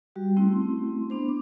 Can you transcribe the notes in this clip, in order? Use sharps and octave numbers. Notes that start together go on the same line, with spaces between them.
G3 F#4 G4
A3 C4 C#4 E4 C6
B3 D4 C5
D6